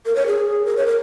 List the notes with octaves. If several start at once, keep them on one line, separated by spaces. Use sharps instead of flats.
A#4
C#5
G#4
A#4
C#5
A#4